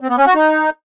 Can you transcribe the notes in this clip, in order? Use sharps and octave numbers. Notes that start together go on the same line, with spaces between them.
C4
B3
C#4
F#4
D#4